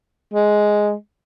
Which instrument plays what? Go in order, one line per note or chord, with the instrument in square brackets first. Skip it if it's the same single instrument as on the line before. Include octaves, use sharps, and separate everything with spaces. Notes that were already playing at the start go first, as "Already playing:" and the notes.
[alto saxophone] G#3